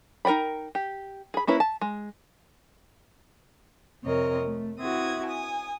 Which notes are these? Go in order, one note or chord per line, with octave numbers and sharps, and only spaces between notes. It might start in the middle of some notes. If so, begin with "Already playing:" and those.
D#4 A#4 D#5 G5 B5
G4
G#4 B5
A#3 C#4 E4 B4
A5
G#3
F2 C3 C4 A#4 C#5 D#5
A3
C4 E4 F#4 D#6 G#6
G#5 D#6